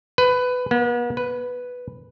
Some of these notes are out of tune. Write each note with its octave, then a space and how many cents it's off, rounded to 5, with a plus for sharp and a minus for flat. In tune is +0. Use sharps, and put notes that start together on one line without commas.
B4 +15
B3 -40
B4 +0